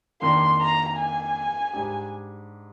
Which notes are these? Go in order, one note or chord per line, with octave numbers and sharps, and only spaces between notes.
F2 D#3 A#3 D4 C6
A#5
G#5
G#2 G3 D4 G4